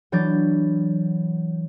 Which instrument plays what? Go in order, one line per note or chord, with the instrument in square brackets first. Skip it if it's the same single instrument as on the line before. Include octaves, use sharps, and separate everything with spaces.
[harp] E3 F#3 D4 G6 A6